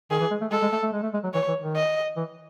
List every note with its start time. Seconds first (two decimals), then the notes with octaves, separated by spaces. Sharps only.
0.11 D#3 G#4
0.21 E3
0.31 G#3
0.41 A3
0.52 G#3 A4
0.62 G#3
0.72 A3
0.83 A3
0.93 G#3
1.03 A3
1.14 G#3
1.24 F#3
1.34 E3 C#5
1.48 E3
1.62 D#3
1.76 D#5
2.17 E3